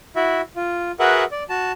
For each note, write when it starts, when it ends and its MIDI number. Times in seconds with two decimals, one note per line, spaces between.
0.16 0.41 64
0.16 0.41 66
0.16 0.41 76
0.56 0.91 65
0.99 1.24 66
0.99 1.24 68
0.99 1.24 70
0.99 1.24 71
0.99 1.24 76
0.99 1.24 78
1.31 1.44 74
1.49 1.72 66
1.49 1.72 81